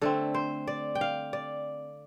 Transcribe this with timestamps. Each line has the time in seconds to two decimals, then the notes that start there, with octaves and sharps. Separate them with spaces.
0.01 D3 A3 C4 A4
0.34 C5
0.67 D5
0.95 G5
1.01 F5
1.33 D5